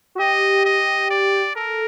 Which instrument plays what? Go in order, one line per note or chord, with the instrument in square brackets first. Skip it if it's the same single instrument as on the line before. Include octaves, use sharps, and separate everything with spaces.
[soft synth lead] F#4
[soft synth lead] G4 [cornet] D#5
[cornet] D#5
D5
[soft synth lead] A4 [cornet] A#4